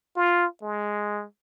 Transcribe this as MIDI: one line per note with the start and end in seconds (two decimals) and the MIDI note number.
0.16 0.46 65
0.62 1.25 56